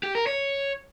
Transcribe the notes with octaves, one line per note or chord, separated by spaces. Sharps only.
G4
A#4
C#5